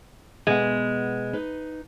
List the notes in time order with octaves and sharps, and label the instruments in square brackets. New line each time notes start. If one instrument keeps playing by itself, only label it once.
[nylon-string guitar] B2 B3 F#5 [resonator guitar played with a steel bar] G#3
[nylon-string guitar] D#4 B4